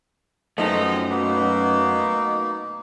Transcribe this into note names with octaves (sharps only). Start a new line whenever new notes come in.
F#2 F3 G#3 A3 B3 C4 D#4
B2 A#3 D#4